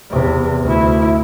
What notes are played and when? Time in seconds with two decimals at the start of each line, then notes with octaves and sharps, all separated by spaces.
0.10 E2 C3
0.63 D2 E4